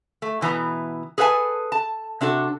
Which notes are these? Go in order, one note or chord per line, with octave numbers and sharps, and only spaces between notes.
A3
B2 E3 B3 A#5
G#4 A4 B4 F5 G#5 A5
A5
C3 D4 F#4 A4